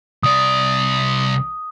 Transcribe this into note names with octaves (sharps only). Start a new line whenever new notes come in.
C2 D5 D#6